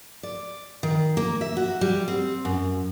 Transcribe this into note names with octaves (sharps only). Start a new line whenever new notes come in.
D5
D#3
A#3
E5
F#4
G3
C4
F#2